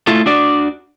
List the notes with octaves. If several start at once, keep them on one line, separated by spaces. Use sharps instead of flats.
A3 E4 F4 A4
D4 F#4 D5